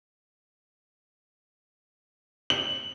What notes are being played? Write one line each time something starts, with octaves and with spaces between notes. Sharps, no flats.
F#7